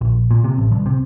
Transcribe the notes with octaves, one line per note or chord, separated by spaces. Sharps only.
A#1
A#2
C3
A1
C2
C3